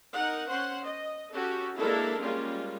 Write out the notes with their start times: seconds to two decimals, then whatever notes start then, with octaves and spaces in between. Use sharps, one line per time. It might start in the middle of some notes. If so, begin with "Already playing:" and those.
0.12 D#4 A#4 F#5
0.48 C#4 C5 F#5
0.83 D#5
1.31 C#4 F#4 G4 A4
1.79 G#3 A#3 D4 E4 A4 A#4
2.20 G3 G#3 A#3 C#4 F4